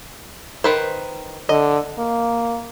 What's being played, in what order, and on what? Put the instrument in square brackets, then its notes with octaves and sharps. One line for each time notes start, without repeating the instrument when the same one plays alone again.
[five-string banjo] D#3 B4 C5
[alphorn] D3 [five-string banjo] D#5
[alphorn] A#3